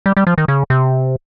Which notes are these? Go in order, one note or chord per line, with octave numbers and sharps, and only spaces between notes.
G3
G3
F3
D#3
C#3
C3